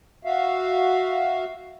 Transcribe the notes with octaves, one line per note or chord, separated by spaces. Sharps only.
F#4 E5 F5